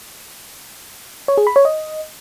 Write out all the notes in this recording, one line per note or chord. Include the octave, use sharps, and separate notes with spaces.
C#5
G#4
B5
C#5
D#5